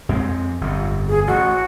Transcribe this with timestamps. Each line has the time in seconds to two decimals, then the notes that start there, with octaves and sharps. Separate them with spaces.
0.09 F2 G#3 C4
0.61 G1 F2
1.08 G#4
1.27 A1 F#4